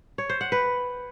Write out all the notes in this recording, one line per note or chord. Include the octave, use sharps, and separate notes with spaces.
C#5
C5
F#5
B4